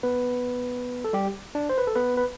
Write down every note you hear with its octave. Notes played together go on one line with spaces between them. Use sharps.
B3 B4
A4
G3 G4
D4
C5
B4
A4
B3 B4
B4